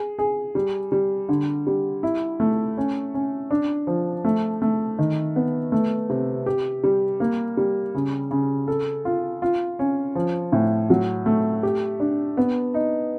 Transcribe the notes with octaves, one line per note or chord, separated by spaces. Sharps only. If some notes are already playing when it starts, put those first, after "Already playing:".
Already playing: G#4
G#4
G3
G3
D3
G3
E4
A3
C#4
C#4
D4
F3
A3
A3
D#3
B3
A3
C3
G4
G3
A#3
G3
C#3
C#3
A4
F4
F4
C#4
F3
A2
F#3
A3
G4
D4
B3
D#4